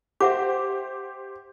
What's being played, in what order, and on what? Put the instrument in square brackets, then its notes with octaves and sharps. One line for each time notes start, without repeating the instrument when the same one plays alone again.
[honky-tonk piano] G4 C5 [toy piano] E5 F#5 D6